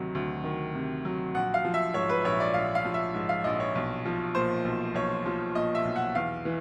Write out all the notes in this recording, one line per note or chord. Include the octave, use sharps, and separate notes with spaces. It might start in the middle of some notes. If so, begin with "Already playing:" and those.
Already playing: D2 C3 D#3 F#3
D2
D#3
C3
F#3
A#1 F#5
F5
F3
E5
G#2 C#5
B4
A#1 C#5
D5
A#1 F5
F5
F3
E5
G#2
F5
A#1 D#5
C#5
B1
F3
A#2 C5
B1
B1 C#5
F3
A#2 D#5
E5
B1
F#5
E2 F5
E3